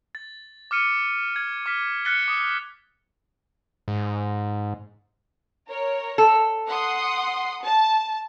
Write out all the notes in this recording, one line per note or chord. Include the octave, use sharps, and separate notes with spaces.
A6
D6 F6 C#7 D#7
G#6
D6 F6 B6
F6 F#6 A6 B6 C#7 G7
D6 D#6
G#2
A#4 C#5
A4
F#5 C6 D#6
A5